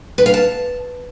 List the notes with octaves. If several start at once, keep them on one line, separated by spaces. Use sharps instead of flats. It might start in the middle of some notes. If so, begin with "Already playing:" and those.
B4
F5
A5